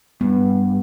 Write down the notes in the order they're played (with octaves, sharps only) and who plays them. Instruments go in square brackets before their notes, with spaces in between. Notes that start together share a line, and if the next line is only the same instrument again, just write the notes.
[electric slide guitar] G2 [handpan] B3